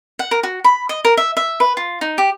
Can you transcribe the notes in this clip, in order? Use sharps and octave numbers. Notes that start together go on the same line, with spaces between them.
F#5
A#4
F#4
B5
D#5
A#4
E5
E5
B4
F4
D#4
G4